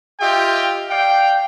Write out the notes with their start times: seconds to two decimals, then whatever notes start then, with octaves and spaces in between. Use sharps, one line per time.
0.21 F4 G4 D#5 E5 G5
0.90 D5 F5 G5